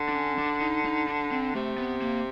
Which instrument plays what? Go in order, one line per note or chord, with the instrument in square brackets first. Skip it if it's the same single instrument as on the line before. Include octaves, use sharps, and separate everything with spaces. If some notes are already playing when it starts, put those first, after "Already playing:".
Already playing: [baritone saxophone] D3
[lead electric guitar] D4
C#4
D4
D#4
D#4
D4
C4
[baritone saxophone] C3 [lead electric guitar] A3
[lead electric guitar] B3
A#3